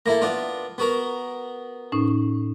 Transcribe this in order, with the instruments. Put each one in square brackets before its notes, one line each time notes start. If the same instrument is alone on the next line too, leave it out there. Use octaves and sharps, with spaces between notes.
[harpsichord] A#3 E4 A4 [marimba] A#6
[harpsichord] B3 D4 F4
B3 F#4 A#4
[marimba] A2 C#4 D#4